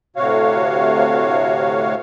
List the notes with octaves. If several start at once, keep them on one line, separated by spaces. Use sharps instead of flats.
D2 A2 C3 F#4 C#5 F5